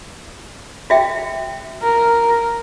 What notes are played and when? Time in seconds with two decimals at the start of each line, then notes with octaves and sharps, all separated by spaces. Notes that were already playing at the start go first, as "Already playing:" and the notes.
0.90 F#4 E5 G5
1.82 A#4